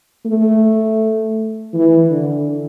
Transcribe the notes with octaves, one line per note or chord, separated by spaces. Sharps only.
A3
E3
D3